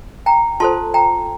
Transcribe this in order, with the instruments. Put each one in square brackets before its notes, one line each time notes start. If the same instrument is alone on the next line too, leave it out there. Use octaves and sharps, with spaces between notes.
[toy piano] G5 A#5
F4 A4 C5 A5 C6
G5 A#5